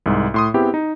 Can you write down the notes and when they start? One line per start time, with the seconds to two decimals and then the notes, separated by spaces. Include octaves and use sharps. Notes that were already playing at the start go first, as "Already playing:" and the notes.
0.06 C2 G#2
0.34 A2 C6 D#6
0.54 B3 C4 E4 G4 G#4
0.74 D#4